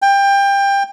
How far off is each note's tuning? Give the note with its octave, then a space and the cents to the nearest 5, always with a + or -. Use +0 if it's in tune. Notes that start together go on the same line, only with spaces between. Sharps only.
G5 +20